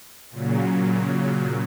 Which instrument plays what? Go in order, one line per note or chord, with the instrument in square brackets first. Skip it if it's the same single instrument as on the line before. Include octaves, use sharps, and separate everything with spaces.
[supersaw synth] A#2 C#3 F#3